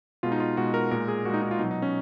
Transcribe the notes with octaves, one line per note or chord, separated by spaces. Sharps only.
B2 G#3 F4
D#4
F4
B2 G#3 F#4
A#4
A#2 G#3 A#4
G#4
A#2 G#3 D#4 F#4
D#4
F4
B2 F#3 D#4
D#4
C#4